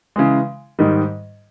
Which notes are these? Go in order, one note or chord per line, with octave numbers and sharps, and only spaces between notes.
C#3 E3 G#3
G#2 D#3 G3